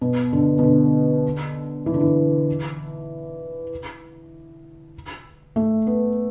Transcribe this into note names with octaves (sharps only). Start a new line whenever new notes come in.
B2
D3
B2
D3
E3
D3
E3
A3
B3